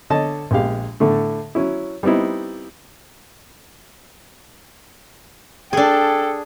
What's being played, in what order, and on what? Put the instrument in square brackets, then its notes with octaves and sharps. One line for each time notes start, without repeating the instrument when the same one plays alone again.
[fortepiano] D3 C#5 D#5 A5
A#1 G#3 G4 F5
A2 D3 A3
F#3 C#4 E4
G3 B3 C4 D#4 E4
[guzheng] D4 G#4 [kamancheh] A4 G5